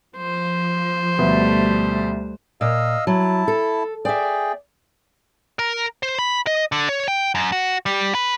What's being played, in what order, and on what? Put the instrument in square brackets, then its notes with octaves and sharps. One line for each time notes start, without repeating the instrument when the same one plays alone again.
[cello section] F3 [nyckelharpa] C5
[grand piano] D2 B2 B4 [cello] G3 A3
[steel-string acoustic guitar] A#2 [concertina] D#5 F5 E6
[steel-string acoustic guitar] F#3 [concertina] E4 A5
[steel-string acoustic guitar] A4
[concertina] G#4 G5 [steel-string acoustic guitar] D5 E5
[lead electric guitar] A#4
C5
B5
D#5
D3
C#5
G5
F#2
F#4
G3
B4